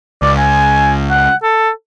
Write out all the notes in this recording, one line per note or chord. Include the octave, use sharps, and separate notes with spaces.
C#2 D5
G#5
F#5
A4